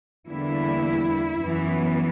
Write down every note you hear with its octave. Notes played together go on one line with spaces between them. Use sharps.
E2 D3 G3 A#3 E4
F#2 E3 B3